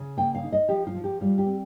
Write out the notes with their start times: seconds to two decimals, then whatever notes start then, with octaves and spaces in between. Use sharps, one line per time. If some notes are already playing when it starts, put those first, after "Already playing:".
Already playing: C#3
0.17 A#3 G5
0.35 F5
0.43 D#4
0.52 D#5
0.69 F3 G4
0.87 F4
0.95 F3
1.04 G4
1.21 G3 F4
1.38 G4
1.46 C4